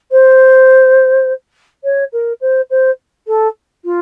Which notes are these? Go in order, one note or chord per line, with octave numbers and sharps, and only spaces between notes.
C5
C#5
A#4
C5
C5
A4
F4